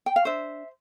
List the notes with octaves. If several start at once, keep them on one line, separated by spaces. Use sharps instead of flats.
G5
F5
D4 C5 E5